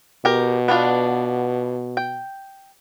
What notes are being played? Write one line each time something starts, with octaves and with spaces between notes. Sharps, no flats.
B2 G4 A#4
B3 D4 F4
G5